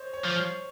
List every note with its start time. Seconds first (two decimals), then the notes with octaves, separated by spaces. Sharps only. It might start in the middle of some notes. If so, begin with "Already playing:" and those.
Already playing: C5 C#5 D#5
0.13 C#5
0.25 F3 C5
0.36 C#5